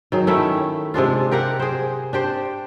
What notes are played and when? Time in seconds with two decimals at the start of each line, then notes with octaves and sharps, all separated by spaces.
0.12 D#3 F#3 G#4
0.27 D#3 A3 C#4 E4
0.94 C3 G#3 D4 F4
1.31 G4 A#4 F5 F#5
1.59 G#4 C5
2.13 D4 G4 C5